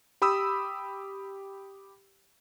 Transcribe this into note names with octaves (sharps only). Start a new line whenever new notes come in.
G4 B5 D#6 E6